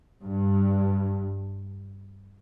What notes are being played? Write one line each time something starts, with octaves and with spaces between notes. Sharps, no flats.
G2